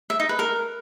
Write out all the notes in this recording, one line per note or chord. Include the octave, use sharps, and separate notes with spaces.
E5
D#4
B4
A#4